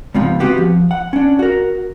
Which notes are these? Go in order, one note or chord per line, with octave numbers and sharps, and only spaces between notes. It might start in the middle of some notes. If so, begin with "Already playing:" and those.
C#2 G#2 C3 F3 B3
E3 B3 C4 F#4 G4
F3
F#5
C#4 D4
F#4 A#4